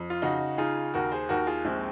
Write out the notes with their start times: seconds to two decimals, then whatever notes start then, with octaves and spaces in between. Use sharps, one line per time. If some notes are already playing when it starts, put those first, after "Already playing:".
Already playing: F2
0.10 F4
0.22 C#3 D#4 F#4
0.58 D#4 F4 G#4
0.94 D#2 F#4 A#4
1.12 G#4 C5
1.29 D#2 F#4 A#4
1.47 F4 G#4
1.65 A#1 G#3 C4